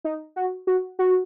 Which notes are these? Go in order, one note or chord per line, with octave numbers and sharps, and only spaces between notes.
D#4
F#4
F#4
F#4